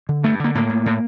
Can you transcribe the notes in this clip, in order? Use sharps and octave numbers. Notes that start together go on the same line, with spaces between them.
D3
G2 A3
D3 A#3
A2 A#3
A2
A2